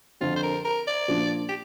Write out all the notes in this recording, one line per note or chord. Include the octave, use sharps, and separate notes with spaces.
F2 D3 F3 C4 F4
C5
A#4
A#4
D5
A#2 F3 D4
G4